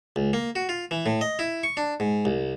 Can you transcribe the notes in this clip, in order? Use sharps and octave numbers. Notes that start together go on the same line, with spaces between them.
C#2
A#3
F#4
F4
E3
A2
D#5
E4
C#6
D4
G#2
C2